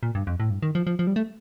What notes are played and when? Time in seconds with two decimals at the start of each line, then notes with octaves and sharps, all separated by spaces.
0.03 A#2
0.15 G2
0.27 F2
0.40 A2
0.50 G2
0.63 D#3
0.75 F3
0.87 F3
0.99 F3
1.07 G3
1.16 A3